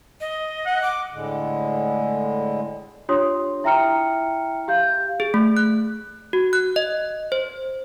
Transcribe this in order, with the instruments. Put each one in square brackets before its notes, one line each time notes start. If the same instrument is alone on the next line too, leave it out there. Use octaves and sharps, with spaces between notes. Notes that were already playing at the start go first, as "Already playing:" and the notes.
[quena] D#5
[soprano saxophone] F#5
[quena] D6
[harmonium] A2 D3 G#3
[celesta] D4 F4 G4 C#5 C6 D#6
E4 E5 G5 A#5 F6 C#7
G4 F5 G6
[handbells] G#4
A3
F#6
F#4
F#6
D#5
C5